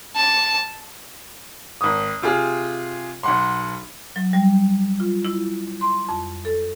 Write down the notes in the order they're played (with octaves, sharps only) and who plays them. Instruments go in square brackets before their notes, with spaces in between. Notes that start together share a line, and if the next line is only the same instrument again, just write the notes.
[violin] A5
[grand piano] G#1 D#6
C3 F4 G#4 F6
B1 F#5 C6
[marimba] F#3
G3
F4
E4
C6
F2
A4